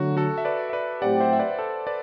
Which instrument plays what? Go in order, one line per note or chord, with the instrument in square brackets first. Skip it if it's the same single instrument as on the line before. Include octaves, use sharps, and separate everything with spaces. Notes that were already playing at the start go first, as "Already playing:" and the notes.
Already playing: [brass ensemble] D3 F#3 A3 [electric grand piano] F#4
[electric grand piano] F#4 A4
E5
B4 D5
E5
B4 D5
[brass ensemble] A2 F#3 C4 G4 [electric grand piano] D5 F#5
[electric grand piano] C5 E5
E5
B4 D5
A4 C5
B4 D5